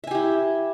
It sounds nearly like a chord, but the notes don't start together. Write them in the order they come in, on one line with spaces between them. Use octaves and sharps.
E5 G#5 G4 E4